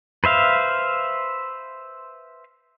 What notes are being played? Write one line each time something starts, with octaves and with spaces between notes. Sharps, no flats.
B4 C5 E5 F5